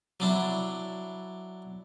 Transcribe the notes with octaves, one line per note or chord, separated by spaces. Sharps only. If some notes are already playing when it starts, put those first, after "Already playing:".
F#3 D4 E4